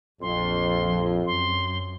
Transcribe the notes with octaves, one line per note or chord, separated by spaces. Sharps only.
A#1 F2 F3 C6
F#2 C6